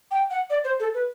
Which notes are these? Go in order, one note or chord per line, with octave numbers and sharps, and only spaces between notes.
G5
F#5
D5
C5
A4
B4